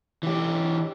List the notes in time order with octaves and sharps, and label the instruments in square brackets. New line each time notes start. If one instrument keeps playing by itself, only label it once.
[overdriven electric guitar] E3 G4